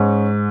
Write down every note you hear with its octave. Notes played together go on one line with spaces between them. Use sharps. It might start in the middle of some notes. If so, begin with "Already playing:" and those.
Already playing: G#2 C#4